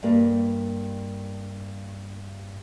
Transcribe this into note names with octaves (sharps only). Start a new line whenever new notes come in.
G2 A#3